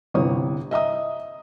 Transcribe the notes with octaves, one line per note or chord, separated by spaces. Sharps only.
G1 C3 E3 C#5 D#6
D#5 E5 A#5 D#6